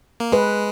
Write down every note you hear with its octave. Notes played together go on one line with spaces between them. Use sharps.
A#3
G#3 B4